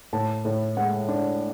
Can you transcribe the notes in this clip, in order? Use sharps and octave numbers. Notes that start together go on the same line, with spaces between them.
A2 A5
A2
G#3 F#5
D4